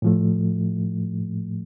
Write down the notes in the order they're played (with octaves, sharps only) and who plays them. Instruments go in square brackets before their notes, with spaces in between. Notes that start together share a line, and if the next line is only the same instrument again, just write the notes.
[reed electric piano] A2 F3 A3